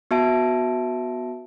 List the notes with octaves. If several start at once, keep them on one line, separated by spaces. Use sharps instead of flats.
B3 F#4 E5 A5 D7